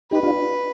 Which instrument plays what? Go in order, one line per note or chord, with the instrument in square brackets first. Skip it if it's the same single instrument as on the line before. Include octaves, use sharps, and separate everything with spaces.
[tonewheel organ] D#4 G4 [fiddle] B4
[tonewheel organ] D4 F4